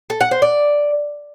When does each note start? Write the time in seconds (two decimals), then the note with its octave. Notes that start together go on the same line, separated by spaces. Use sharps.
0.10 A4
0.21 F#5
0.31 C5
0.42 D5